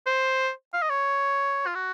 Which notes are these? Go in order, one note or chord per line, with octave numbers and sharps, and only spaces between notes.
C5
F5
D#5
C#5
F4
F#4